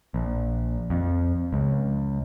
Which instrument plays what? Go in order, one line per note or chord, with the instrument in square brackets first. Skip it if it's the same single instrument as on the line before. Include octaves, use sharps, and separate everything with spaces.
[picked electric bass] A#1
F2
C#2